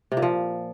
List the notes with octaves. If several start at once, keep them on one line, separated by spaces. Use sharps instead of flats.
C3
A#2
F3